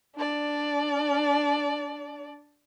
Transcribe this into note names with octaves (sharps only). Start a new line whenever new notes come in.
D4 D5